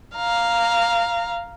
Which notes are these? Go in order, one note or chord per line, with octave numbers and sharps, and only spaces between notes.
F5 A#5